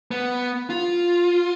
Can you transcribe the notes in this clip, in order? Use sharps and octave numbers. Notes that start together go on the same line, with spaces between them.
B3
F4